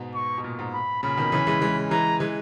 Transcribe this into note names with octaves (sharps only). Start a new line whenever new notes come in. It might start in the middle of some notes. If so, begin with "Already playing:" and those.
Already playing: G#2 B2
C#6
B2
A#2
G#2
B5
A#2 C#3 B5
B2 D#3
C#3 E3
E3 G#3
E3 G#3
E3 G#3 A#5
E3 G#3